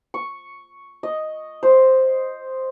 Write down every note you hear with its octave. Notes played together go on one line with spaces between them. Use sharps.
C#6
D#5
C5